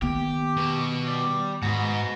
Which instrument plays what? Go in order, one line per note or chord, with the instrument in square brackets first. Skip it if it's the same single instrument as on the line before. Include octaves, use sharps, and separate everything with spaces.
[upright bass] D#3 B3 [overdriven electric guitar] G4
[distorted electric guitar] B2
[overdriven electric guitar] G4 D5
[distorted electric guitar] G#2 [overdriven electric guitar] F#4 B4